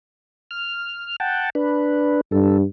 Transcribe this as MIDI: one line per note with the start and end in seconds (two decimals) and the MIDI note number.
0.51 1.16 89
1.20 1.50 78
1.20 1.50 79
1.20 1.50 81
1.55 2.21 62
1.55 2.21 71
2.32 2.63 43
2.32 2.58 69